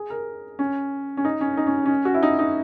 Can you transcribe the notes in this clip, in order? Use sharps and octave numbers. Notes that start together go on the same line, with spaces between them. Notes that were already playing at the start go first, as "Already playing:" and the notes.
Already playing: G#4
A#4
C#4
C#4
D#4
C#4
D#4
C#4
C#4
F#4
E4
D#4
D#4